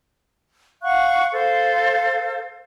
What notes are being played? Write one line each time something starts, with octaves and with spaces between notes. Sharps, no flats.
F5 F#5 C#6 F#6
A4 C5 F5